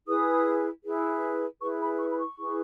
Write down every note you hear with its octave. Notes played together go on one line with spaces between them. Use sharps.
E4 G#4 B4 D#6
E4 G#4 B4
E4 G#4 B4 C#6
B5
C#6
B5
C#6
E4 G#4 B4